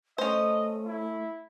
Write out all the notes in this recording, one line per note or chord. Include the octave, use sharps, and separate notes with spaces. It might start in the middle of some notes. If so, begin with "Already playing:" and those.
A3 C#4 C5 D#5
E4